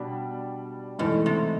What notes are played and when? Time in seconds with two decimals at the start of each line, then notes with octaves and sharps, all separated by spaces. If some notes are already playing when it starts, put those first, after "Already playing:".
Already playing: B2 G3 D4
0.99 G#2 B2 E3 A3
1.26 C3